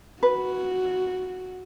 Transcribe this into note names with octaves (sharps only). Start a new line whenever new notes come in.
F#4 B4